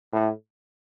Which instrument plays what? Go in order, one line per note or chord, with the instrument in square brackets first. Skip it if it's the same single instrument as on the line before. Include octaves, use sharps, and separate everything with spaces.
[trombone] A2